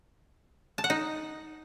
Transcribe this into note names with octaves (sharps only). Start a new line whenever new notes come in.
A5
F#5
D#4